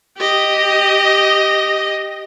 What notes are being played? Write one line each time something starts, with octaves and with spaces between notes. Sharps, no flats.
G4 D#5